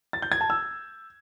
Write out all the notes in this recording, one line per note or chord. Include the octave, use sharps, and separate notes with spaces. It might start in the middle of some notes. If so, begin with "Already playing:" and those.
A6
G6
G#6
A5
E6